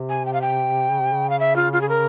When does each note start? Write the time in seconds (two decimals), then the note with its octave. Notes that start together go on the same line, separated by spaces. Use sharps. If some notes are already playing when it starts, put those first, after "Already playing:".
Already playing: C3
0.09 G#5
0.26 G5
0.33 F5
0.41 G5
0.91 C#3
1.02 C3
1.12 C#3
1.30 F5
1.40 E5
1.56 F4
1.73 F4
1.81 G#4
1.89 A#4